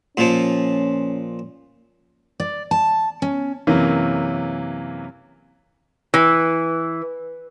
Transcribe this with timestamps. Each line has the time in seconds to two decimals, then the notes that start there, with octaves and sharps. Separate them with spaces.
0.17 A#2 F3 C#4
2.40 D5
2.71 A5
3.22 C#4
3.67 F#2 C3 E3 A#3 C#4
6.14 E3